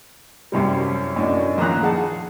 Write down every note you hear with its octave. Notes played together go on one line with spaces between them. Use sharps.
C2 F#2 C3 G3
F#2 A2 D4 D#4
A#1 A#2 D#3 A#5 F#6
G#4 F#5 A5